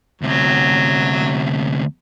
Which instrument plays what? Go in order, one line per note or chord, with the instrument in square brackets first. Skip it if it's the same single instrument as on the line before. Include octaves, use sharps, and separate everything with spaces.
[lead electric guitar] D2 C3 [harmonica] F#3